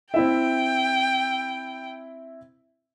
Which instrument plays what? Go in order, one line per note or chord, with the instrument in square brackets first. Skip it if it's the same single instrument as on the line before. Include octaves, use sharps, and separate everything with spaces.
[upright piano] C4 E4 E5 [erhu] G5